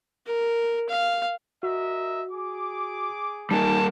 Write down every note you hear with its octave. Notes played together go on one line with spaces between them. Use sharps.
A#4
F5
F#4 A#4 D#5 E5
G#4 D6
G3 A#3 D#4 G#5 A5